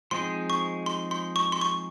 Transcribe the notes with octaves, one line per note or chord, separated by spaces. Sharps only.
F3 G#3 C4 D#4 G#4 C6
C#6
C6
C6
C#6
C6
C#6